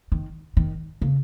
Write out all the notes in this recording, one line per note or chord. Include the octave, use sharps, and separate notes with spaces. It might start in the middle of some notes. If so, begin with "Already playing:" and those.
D#3
D#3
C#3